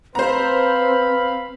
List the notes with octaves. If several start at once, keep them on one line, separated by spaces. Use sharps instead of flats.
C4 B4 C5 F5 A#5 B5